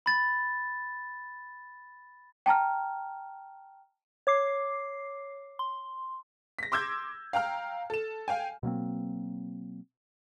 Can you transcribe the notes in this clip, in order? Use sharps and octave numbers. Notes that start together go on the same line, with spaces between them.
B5 A6
G5 A5 A#5 F6
C#5 D6 C7
C6
A#6 B6
C6 D6 E6 G6 G#6
F5 G5 A#5 F6
A4 E7
F5 G5 G#5
B2 F#3 A#3 C4